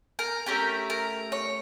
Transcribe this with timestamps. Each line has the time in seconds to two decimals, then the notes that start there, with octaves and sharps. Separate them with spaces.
0.19 A#4
0.46 A3 C#4 G4 A#4
0.90 A#4
1.32 C#5